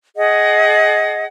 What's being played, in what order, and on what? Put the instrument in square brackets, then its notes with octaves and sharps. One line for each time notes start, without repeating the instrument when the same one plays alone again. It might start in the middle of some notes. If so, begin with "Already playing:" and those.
[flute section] G#4 D#5 F#5